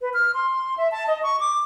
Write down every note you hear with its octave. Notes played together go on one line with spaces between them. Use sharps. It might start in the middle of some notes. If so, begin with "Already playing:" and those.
B4
F6
C6
E5
A5
D#5
C#6
D6